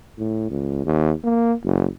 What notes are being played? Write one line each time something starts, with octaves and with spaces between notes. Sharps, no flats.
A2
C#2
D#2
A#3
F#1